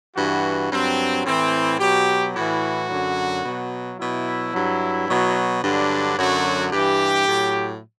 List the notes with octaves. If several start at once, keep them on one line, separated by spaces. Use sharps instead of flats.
G2 E3 F#4
G2 F#3 C4
A2 E3 C4
B2 F#3 G4
A2 E3 F#4
F#2 D3 F#3
B2 F#3
B2 F#3 E4
G2 F#3
B2 F#3
G2 D3 F#3 D4
F#2 D3 F#3 F#4
G2 E3 G4
A2 F#3